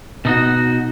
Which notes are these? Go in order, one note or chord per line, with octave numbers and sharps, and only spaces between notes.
B2 D#4 F#4